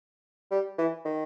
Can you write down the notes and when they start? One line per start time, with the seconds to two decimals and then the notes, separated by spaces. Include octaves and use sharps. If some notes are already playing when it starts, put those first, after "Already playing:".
0.51 G3
0.78 E3
1.05 D#3